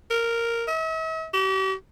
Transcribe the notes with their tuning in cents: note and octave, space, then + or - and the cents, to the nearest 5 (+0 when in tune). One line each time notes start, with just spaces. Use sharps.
A#4 -5
E5 -45
G4 -40